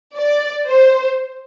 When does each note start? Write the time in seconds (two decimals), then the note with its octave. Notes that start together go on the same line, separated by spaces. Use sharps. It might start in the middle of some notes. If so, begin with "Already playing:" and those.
0.16 D5
0.68 C5